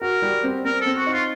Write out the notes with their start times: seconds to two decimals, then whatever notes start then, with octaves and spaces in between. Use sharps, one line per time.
0.01 F#4 A#4
0.22 G3
0.43 C4
0.65 C4 A#4
0.81 A4
0.86 C4
0.97 F#4
1.07 D#4
1.13 F4